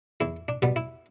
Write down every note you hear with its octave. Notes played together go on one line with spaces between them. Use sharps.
E2 E4
D4
B2 G3 B3
E4